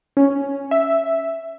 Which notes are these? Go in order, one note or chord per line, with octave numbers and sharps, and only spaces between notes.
C#4
E5